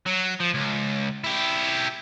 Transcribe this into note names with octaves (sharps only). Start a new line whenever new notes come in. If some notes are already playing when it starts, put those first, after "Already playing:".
F#3
F3
C#2
E4 G4